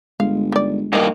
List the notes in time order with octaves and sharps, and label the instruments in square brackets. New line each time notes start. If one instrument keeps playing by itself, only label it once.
[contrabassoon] G1 [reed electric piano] G#3 [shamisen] F5
[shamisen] D#3 D5
[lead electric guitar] G2 A#3 [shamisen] D#4 D#5